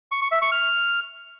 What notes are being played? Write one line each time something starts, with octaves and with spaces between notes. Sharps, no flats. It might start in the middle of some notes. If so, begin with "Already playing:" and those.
C#6
C#6
E5
C#6
F6